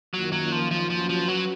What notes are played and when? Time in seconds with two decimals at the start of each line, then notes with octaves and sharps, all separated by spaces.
0.14 F#2 D#3 F#3 A#3 F4
0.32 F#3
0.52 F3
0.71 F3
0.90 F3 F#3 C#4 F#4 B4
1.09 F3
1.28 F#3